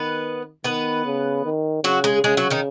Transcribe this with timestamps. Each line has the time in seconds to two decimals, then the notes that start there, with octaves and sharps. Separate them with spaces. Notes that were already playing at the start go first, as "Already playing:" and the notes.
Already playing: D#3 B3 B4
0.64 D#3 B3 B4
1.05 C#3
1.45 D#3
1.84 C#3 F#3 F#4
2.04 G#3 G#4
2.24 C#3 G#3 G#4
2.37 F#3 F#4
2.50 D#3 D#4